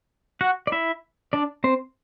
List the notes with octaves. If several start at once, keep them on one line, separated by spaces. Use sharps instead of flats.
F#4 F#5
D5
E4 E5
D4 D5
C4 C5